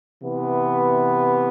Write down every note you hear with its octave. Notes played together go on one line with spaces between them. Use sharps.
C3 E3 B3